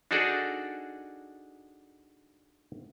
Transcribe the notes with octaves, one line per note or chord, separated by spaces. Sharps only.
D4 D#4 F#4 G#4 A4 D5